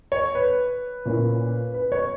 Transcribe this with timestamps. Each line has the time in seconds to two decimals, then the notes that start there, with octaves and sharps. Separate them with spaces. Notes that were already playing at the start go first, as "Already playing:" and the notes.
0.12 C#5
0.35 B4
1.05 A#2 A#3 C#4 E4
1.74 B4
1.92 C#5